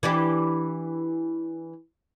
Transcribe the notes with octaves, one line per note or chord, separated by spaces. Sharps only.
E3 D4 G4